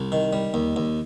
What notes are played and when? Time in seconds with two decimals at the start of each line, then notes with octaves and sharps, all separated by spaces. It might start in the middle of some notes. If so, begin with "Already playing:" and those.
Already playing: C2
0.12 D#3
0.33 G3
0.54 D#2
0.76 D#2